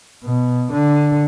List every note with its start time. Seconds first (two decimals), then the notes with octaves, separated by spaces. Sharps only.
0.24 B2
0.72 D3